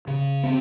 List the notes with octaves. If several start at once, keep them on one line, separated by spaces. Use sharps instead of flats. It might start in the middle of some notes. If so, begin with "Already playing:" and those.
C#3
C4